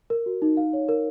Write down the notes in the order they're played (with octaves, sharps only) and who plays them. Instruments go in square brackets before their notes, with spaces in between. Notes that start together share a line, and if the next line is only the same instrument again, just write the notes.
[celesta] A#4
F#4
D#4
F5
C#5
A#4